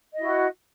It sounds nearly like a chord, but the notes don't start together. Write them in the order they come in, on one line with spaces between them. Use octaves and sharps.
D#5 E4 F#4